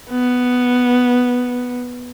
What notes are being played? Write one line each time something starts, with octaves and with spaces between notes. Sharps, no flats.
B3